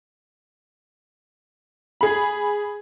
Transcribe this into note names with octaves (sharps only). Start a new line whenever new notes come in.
G#4 B5